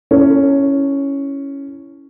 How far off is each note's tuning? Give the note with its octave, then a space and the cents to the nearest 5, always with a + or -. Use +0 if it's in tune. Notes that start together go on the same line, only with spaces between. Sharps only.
C#4 +0 E4 +0 A4 +30